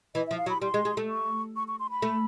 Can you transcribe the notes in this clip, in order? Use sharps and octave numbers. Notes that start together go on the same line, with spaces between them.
E3 D#5
E5
F3
F5
F#3
B5
G3 C6
G#3
G#3
A3
C#6
C#6
C#6
C6
B5
A3